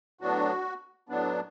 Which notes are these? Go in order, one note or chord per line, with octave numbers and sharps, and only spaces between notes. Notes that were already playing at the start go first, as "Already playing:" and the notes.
A2 F#3 B3 D4 F#4
A2 F#3 B3 D4